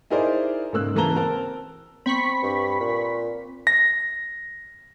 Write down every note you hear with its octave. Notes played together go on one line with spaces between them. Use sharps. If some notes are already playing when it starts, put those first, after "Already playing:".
D#4 E4 G#4 A#4 C5 D5
G#2 C#3 A#3 E6 F#6
C#3 E3 A#3 A5 A#5 G7
C4 A#4 A5
C4 B5 C#6 B6
G2
A#2
A#6